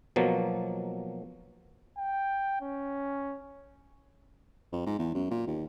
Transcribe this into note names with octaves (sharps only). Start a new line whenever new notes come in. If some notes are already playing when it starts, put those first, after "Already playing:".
B2 F3 F#3 A#3
G5
C#4
F2
G#2
E2
F#2
A#2
D#2